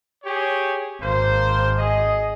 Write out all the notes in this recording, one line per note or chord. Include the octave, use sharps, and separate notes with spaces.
G4 G#4 C#5
G#1 A#3 C5
G#4 D#5